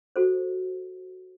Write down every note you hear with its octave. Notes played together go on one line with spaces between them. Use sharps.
F#4 A4 C5